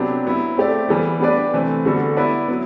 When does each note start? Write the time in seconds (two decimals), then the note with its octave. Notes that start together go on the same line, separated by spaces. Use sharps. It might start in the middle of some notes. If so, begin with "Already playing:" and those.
Already playing: C3 F#3 B3 D4 G4
0.25 F#3 B3 E4
0.57 A3 C4 G4 D5
0.89 E3 G3 B3
1.20 B3 D4 G4 B4 D5
1.53 C3 E3 A3 C4
1.85 D3 G3 B3 F#4 A4
2.17 B3 E4 B4 D5
2.48 F#3 B3